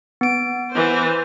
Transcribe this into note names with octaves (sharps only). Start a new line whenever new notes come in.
B3 D7
E3 C5